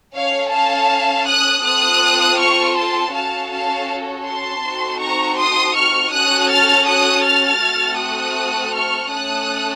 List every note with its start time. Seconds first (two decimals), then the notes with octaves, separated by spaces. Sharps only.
0.14 C#4 A4 C#5 F5
0.52 F5 A5
1.26 D#6 F#6
1.64 C4 F4 A4 D#6 F#6
2.38 C#6 F6
2.76 A5 C6
3.13 C#4 F#4 A4 F5 A5
3.51 F5 A5
4.26 A5 C6
4.63 C4 D#4 F#4 A4
5.00 A#5 C#6
5.37 C6 D#6
5.74 C#6 F6
6.11 C#4 F#4 A4 D#6 F#6
6.49 F6 A6
6.87 D#6 F#6
7.24 F6 A6
7.61 A3 C4 F#4 A4
7.98 D#6 F#6
8.73 C#6 F6
9.11 A3 C#4 A4 D#6 F#6